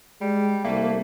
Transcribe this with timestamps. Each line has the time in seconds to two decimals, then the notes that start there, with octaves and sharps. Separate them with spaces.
0.21 G3 G#3
0.64 C2 A3 A#3